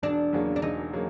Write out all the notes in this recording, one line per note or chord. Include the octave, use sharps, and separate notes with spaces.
E1 D4
E2 C#3 F#3 A#3
D4
E1 D#4
C#3 F#3 A#3